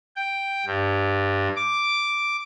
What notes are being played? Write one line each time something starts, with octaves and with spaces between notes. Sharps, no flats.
G5
G2
D6